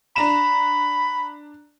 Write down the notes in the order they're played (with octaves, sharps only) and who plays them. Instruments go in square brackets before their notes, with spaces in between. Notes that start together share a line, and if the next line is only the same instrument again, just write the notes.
[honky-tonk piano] D4 A#5 E7 [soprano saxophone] B5